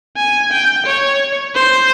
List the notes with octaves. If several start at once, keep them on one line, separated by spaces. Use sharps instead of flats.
G#5
G5
C#5
C5